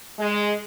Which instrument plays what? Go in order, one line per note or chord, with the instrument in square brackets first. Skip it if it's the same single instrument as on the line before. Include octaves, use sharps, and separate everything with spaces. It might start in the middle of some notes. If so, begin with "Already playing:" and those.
[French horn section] G#3